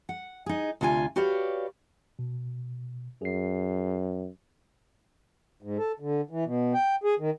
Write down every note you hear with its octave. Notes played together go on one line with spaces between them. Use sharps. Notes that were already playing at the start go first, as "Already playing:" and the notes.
F#5
D#4 G#4
D2 C3 F4 A#4 G#5
F#4 G4 B4 C#5 D5 F5
B2
F#2 G#4 C7
G#2
A4
D3
E3
B2
G5
G#4
D#3